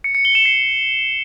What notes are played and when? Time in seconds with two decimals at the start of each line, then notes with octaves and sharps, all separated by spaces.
0.04 C#7
0.15 C#7
0.25 G7
0.35 E7
0.45 C7